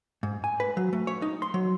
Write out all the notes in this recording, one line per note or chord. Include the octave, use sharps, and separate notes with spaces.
G#2
G#5
B4
F#3
A3
C#5
D#4
C6
F#3